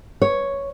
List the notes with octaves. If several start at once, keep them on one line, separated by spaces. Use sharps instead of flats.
C#5